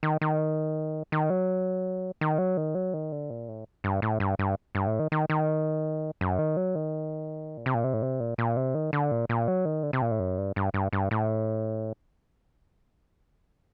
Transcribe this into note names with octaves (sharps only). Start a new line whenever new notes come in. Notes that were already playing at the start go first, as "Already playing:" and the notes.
D#3
D#3
D#3
F#3
D#3
F#3
D#3
F#3
D#3
D3
A#2
A2
G2
A2
G2
G2
G2
A2
D#3
D#3
D#3
F#2
D#3
F#3
D#3
A#2
C3
A#2
C3
A2
C3
A#2
A#2
C3
D#3
D3
A#2
A#2
F#3
D#3
D3
C3
A#2
A2
F#2
G2
G2
G2
G2
A2